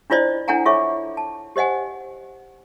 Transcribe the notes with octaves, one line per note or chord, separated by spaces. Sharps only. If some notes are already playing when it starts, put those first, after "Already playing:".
D4 E4 F4 C5 D5 D#5
D4 E4 A4 F#5 G#5 A#5
F4 A4 C#5 E5 C#6 D6
A5
G4 C5 D#5 F#5 G#5